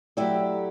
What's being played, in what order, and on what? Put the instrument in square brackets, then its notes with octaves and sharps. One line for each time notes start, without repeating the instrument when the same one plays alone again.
[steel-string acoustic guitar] F#3 A3 E4 G4 D5